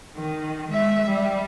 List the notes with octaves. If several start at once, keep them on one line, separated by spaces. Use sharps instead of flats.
D#3
G#3 E5
G3